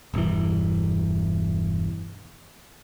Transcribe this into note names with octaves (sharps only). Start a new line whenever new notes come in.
E1 G2 E3